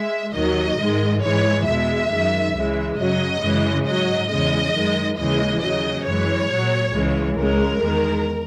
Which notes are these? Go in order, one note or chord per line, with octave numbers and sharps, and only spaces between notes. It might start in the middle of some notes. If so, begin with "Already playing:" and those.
Already playing: G#3 E5
D#2 D#3 F#3 D#5
G#2 D#3 G#3
G#2 E3 G#3 C#5
E2 B2 G#3 E5
F#2 D#3 G#3
C#2 C#3 E3 G#3
F#2 C#3 F#3 D#5
F#2 C#3 E3 G#3
G#2 F#3 D#5
E2 C#3 G#3 D#5
F#2 D#3 G#3
D#2 C#3 E3 G#3 D#5
D#2 C#3 F#3 D#5
F#2 E3 G#3 C#5
A#2 F#3
C#2 C#3 E3 G#3
C#2 C#3 G#3 A#4
E2 D#3 G#3